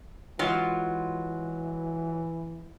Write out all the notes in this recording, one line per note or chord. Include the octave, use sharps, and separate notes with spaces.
E3 F#3 G#3 F4